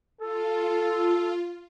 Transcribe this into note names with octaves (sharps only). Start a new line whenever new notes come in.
F4 A4